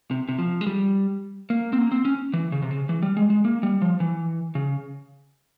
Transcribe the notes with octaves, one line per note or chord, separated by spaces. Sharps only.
C3
C3
F3
G#3
G3
A#3
C4
A#3
C4
C#4
E3
C#3
C3
C#3
E3
G3
G#3
G#3
A#3
G3
F3
E3
C#3